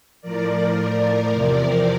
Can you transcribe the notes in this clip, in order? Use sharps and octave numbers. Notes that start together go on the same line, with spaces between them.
A2 F3 A#4 D5
A#4 D5
E2 C3 F3